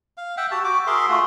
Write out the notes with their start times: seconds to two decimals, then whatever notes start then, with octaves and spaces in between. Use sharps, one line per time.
0.17 F5
0.37 E5 F#5 G5
0.51 F#4 G4 A5
0.64 F#4 D6
0.87 G#4 A#4 E5 C6
1.09 A3 F4 F#4